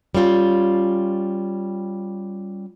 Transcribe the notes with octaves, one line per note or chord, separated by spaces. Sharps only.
G3 C#4 F4 G5